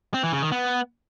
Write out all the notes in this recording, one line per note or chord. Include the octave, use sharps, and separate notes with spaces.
C4
E3
C#3
D#3
B3